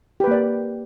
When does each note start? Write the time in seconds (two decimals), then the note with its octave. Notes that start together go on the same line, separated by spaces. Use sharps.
0.20 G4
0.24 B4
0.28 A#3
0.31 D5